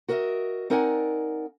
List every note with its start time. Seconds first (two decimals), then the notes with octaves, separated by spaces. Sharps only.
0.08 F#4 A#4 D#5 E5
0.70 C4 D#4 A#4 D5 F#5 G#5